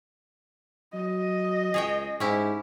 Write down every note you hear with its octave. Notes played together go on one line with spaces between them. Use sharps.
F#3 D#5
C#2 G#4 C#5 G5
G#2 C#4 E4 G4